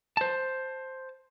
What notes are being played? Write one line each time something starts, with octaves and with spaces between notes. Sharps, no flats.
C5 A5